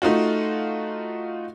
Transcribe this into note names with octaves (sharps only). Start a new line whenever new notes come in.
A3 D#4 F4 F#4